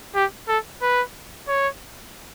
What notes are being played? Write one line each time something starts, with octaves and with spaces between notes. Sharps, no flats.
G4
A4
B4
C#5